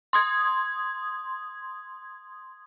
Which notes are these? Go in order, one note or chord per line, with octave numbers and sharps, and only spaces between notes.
C6 D#6 G#6